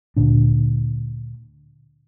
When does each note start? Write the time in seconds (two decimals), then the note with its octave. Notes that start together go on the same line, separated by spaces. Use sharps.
0.17 D2 A#2 D3 D4